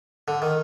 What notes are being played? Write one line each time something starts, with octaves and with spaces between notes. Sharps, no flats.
D3
D#3